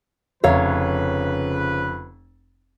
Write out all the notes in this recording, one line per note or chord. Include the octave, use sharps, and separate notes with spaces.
F1 C#3 F3 B4 C#5 F5 A#5